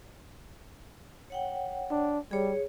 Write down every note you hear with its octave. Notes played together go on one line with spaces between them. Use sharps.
C#5 F#5 G5
D4
G3 G#4 C#5